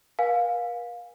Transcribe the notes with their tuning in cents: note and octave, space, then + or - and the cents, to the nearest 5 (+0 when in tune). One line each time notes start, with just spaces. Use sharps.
A#4 +45 F5 +20 G#5 -15